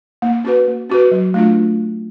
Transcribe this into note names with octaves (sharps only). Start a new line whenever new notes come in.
A#3
C#4 F#4 B4
A#3
C#4 F#4 B4
F#3
A3 D4 F4